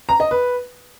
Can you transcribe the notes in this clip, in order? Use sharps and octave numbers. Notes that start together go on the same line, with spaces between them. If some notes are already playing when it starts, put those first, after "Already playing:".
A#5
D#5
B4